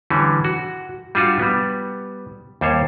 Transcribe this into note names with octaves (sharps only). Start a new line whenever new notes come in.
D3 E3 G3 C#4
F#4
G3 D4 F4 F#4
G3 B3
D#2 G3 C5 C#5